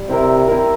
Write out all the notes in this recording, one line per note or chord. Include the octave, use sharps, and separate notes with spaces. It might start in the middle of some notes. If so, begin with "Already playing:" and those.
Already playing: G3
C3 C4 E4 A#4
C4 E4 A#4